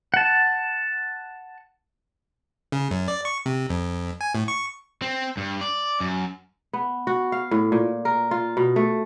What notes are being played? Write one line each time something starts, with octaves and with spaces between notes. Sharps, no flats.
F#5 A5
C#3
F#2
D5
C#6
C3
F2
G#5
A2
C#6
C4
G2
D5
F#2
B3
F#4
F5
A2
A#2
A#4
F4
B2
A3